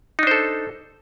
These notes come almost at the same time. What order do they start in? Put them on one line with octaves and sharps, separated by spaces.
D#4 D4 C5 A4